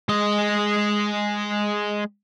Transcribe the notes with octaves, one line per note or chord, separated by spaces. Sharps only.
G#3 D#5